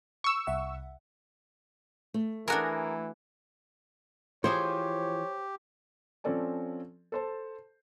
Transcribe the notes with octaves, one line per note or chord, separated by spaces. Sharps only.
C#6 E6
C2 E5 F#5
A3
E3 D4 F#4 G#4 A#4 D#6
E3 F3 G4 G#4 C5 C#5
F3 C4 C#4 A4 D5 G#5
A4 C5 A5